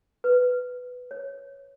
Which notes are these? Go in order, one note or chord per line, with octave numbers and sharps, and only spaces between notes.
B4
C#5